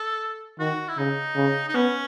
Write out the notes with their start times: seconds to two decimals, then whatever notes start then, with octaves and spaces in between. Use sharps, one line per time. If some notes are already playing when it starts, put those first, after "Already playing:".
Already playing: A4
0.59 D#3 F#4
0.88 E4
0.98 C#3 D#4
1.36 C#3
1.69 D#4
1.74 B3 C#4